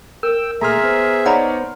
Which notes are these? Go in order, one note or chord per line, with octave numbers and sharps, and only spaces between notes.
A#4 G5 E6
A#2 A3 G#4 E5 A#5 C6 F6
B3 C5
D#4 C#5 D5 F#5 A#5 B5